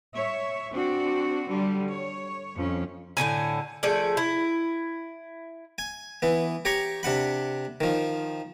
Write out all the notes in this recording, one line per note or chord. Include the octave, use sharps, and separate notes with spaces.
C#5 E5
C4 D4 F#4
D3 G3
C#5
F2 C#4
A2 D3 C#4 G#5
F3 A3 G#4 D5
E4
G#5
E3 B3
G4 C#5 A#5 C#6
C3 D4 F#5 B5
D#3 F3